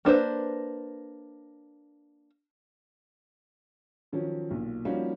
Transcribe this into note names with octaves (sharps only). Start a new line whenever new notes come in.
A#3 D4 B4 C5
D#3 F3 F#3 C#4
B1 A#2
F3 G3 A#3 C#4 D#4 F#4